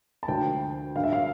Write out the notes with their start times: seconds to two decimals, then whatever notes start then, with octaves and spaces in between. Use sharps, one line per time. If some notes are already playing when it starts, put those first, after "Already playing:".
0.23 A5
0.28 D2 D3 F3 G5
0.96 G2 D3 F3 F5
1.04 E5
1.13 F5